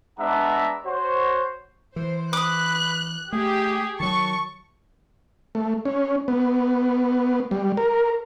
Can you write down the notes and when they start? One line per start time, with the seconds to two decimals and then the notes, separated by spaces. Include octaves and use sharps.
0.19 G#3 B3 D4 E5 F#5 A#5
0.86 F#4 C5 C#5
1.96 E3 C5
2.33 B4 D6 D#6 F#6
3.33 A3 G4 G#4
4.00 D#3 F#3 A5 C#6
5.55 A3
5.85 C#4
6.28 B3
7.51 G3
7.77 A#4